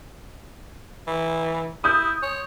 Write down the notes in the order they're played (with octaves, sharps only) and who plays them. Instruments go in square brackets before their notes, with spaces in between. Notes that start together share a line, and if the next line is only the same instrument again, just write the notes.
[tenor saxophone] E3
[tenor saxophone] E4 [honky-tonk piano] D#6 G6
[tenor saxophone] C#5